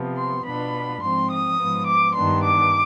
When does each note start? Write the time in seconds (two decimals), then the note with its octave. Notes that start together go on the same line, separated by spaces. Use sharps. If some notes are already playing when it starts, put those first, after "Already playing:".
Already playing: C3 F3 B3
0.17 C6
0.44 B2 B3 D4 F4 B5
1.01 G#2 F3 C4 C6
1.30 D#6
1.58 G#2 F3 B3
1.86 D6
2.14 G2 D#3 B3 D4 C6
2.42 D6